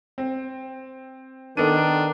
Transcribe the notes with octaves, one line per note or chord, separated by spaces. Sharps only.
C4
D#3 B3 D4 A4 D#7